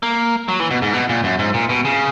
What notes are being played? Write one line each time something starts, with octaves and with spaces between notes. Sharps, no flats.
A#3
F#3
E3
B2
G#2
B2
A#2
F#2
G#2
A#2
B2
C#3